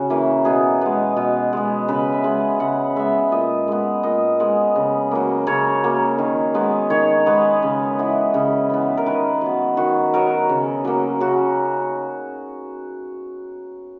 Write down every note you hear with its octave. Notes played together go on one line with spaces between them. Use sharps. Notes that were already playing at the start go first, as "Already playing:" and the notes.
Already playing: C#3 F#4
E3 A#3
B2 G#4
G#3 B3
B2
G#3 B3
C#3 B4
E5
G#3 B3
C#3 F#5
G#3 B3 E5
A#2 D#5
G#3 B3
A#2 D#5
G#3 B3
C#3
F#3 A#3
C#3 C#5
F#3 A#3
D#3
G#3 B3
D#3 C#5
G#3 B3 B4
C#3
E3 B3
C#3
E3 B3
A#4
D#3 B4
F#3 B3
D#3 F#4
F#3 B3 A#4
C#3
F#3 A#3
C#3 F#4